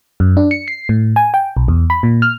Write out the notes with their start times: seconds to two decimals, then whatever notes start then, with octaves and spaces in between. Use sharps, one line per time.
0.20 F#2
0.37 D4
0.51 C#7
0.68 C7
0.89 A2
1.16 G#5
1.34 G5
1.57 B1
1.68 E2
1.90 B5
2.03 A#2
2.22 F6